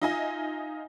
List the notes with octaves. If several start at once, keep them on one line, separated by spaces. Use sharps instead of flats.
D#4 F4 D#5 E5 G#5